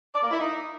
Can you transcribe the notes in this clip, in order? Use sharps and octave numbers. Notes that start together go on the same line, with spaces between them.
D5
A#3
E4
D#4